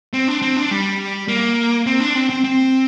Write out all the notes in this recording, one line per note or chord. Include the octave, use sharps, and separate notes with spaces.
C4
D4
C4
D4
G3
A#3
C4
D4
C4
C4
C4